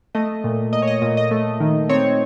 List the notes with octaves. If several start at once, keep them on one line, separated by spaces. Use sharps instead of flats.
A3 D#5
A#2
A#2 D#5
C#5
D#5
A#2 D#5
D#5
A3
D#3
C4 C#5